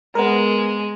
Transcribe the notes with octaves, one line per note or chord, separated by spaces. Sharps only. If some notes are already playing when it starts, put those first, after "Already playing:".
G#3 B3 A#4